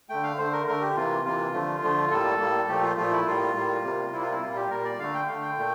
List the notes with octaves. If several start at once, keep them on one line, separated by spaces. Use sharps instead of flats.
D3 A3 G5
F5
D3 A3 C5
A#4
D3 A3 A#4
G4
C3 E3 A#3 F4
C3 E3 A#3 F4
D3 F3 A3
D3 F3 A3
A2 G3 A#3 A4
A2 G3 A#3
A#2 F3 A3 G4
F4
A#2 F3 A3 F4
E4
A2 G3 A#3 F4
A2 G3 A#3
C3 G3 A#3
C3 G3 A#3 E4
F4
E4
A#2 G3 A#3 F4
G4
A#2 G3 A#3 A#4
D5
D3 A3 F5
G5
D3 A3 F5
G5
A#2 A3